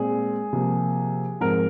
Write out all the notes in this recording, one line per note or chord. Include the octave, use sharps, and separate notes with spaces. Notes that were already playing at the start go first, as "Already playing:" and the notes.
Already playing: A#2 G#3 C4 G#4
C3 F3 A#3
G#2 F3 C4 A#4